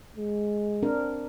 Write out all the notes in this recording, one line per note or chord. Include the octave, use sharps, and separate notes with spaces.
G#3
C4 D4 A#4